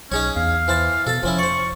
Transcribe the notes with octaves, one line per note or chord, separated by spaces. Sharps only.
B1 C#4 D#4 G#4 C#5
E2 F5
E3 C5 A5
B2 A4 A5
F1 F3 C#4 E4
C5 D5 C#6